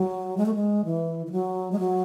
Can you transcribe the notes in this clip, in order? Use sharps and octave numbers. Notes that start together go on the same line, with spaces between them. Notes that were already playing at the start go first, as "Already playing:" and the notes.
Already playing: F#3
G#3
A3
G#3
E3
E3
F#3
G#3
F#3